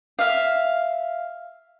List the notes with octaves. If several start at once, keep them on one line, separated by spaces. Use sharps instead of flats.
E5 F5